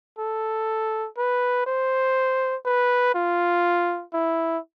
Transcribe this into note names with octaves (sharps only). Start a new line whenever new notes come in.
A4
B4
C5
B4
F4
E4